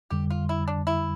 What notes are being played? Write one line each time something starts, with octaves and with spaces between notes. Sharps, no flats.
F2 D3 G3 G4
F4
E4
D4
E4